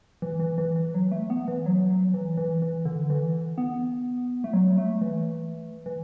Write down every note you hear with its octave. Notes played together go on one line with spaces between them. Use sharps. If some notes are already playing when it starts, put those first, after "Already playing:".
E3
E3
E3
E3
F#3
A3
B3
E3
F#3
F#3
E3
E3
E3
D3
E3
B3
A3
F#3
A3
E3
E3